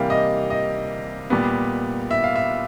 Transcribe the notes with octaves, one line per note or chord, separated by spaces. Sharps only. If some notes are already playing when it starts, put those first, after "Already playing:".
Already playing: C3 E3 G3 A#3 F5
D#5
D#5
A#2 G3 B3
E5
F5
E5